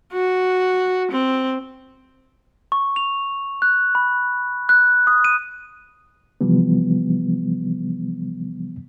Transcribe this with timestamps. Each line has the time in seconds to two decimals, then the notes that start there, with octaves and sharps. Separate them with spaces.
0.13 F#4
1.12 C4
2.72 C#6
2.96 F7
3.62 F#6
3.95 B5
4.69 F#6
5.07 D#6
5.24 D#7
6.41 C3 E3 F3 G3 B3